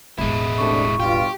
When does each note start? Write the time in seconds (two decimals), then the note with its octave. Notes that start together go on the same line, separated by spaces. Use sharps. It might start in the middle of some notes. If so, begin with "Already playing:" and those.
0.19 E1 A1 G#3 E4
0.58 C3 A3 D4 C#6
1.00 G2 B2 F4 G4